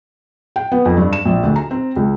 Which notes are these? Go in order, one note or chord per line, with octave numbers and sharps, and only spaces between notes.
G5
B3
F2
G2
E7
A#1
D2
A#5
C4
C#2